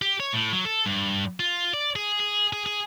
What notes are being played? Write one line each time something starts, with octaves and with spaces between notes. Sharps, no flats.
G4
C#5
A2
F#3
A4
G2
F4
D5
G#4
G#4
G#4
G#4